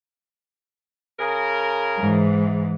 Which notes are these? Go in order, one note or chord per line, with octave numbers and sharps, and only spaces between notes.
C#3 G#4 A#4
G#2 E3